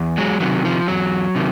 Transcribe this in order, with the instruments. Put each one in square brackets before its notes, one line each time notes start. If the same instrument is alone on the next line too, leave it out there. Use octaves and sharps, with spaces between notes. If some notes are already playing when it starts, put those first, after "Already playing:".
Already playing: [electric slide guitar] E2
F#3 G#3
C3 D#3 F#3
F3
E2 F#3
C3 D#3